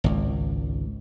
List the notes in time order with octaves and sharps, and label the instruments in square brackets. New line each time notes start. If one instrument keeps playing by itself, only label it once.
[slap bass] G#1 C#2